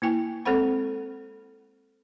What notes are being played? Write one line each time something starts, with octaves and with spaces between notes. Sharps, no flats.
A#3 E4 G5 G#5
G#3 C4 A4 C5 F#5 B5